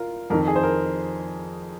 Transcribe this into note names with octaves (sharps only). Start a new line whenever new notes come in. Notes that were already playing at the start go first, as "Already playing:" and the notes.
Already playing: F4 A#4
F2 D#3 A#4
G#4
C5
A#4